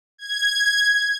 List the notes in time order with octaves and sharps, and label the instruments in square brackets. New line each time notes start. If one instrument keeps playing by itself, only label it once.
[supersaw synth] G#6